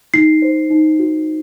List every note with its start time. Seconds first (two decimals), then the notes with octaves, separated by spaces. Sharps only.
0.14 D#4 C7
0.42 C5
0.70 D#4
0.99 F#4